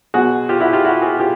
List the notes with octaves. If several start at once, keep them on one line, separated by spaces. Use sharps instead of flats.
B1 B2 F#3 F#4 G#4
F4 G4
E4 F#4
F4 G4
E4 F#4
F#4 G#4
F4 G4